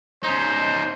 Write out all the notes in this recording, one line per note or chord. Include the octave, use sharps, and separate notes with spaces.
C#4 D#4 C5